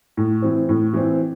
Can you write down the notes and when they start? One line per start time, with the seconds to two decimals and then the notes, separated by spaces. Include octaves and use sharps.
0.17 A2
0.42 E3 C4
0.69 A2
0.93 E3 C4